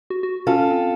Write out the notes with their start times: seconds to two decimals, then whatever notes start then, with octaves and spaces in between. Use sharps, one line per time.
0.10 F#4
0.23 F#4
0.47 C#4 F4 A4
0.59 C#4
0.71 C4